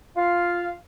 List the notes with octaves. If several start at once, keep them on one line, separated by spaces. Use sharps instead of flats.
F4 F5